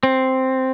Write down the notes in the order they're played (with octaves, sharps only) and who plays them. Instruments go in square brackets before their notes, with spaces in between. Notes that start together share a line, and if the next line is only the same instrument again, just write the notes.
[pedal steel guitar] C4